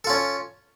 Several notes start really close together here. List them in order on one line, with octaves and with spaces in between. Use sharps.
A4 F4 C#4